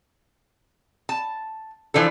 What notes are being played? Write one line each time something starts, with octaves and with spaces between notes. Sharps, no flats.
A5
E3 F3 D4 A4